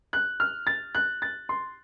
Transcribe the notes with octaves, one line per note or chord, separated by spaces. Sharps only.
F#6
F6
A6
F#6
A6
C6